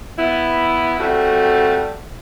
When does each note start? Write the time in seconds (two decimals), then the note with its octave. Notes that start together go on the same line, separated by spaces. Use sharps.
0.18 B3 E4
1.00 G3 A3 C4 F#4